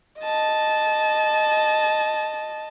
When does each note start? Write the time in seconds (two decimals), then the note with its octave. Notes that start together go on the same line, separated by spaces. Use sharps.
0.20 D#5 A5